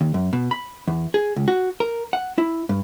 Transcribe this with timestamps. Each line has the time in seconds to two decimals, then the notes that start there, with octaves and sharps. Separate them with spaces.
0.01 D#2
0.14 F#2
0.33 B2
0.51 B5
0.88 E2
1.14 G#4
1.36 C#2
1.48 F#4
1.80 A#4
2.13 F#5
2.38 E4
2.69 G2